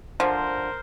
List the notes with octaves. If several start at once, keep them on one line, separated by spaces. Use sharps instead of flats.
D3 F3 A#4 C5